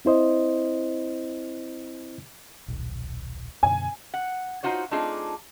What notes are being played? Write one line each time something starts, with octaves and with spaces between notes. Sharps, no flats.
C4 E4 C5 D#5
D#1 B1
F#2 B2 D3 G#5
F#5
D#4 F4 F#4 C5 C#5
A3 C4 D4 D#4 F4 G#4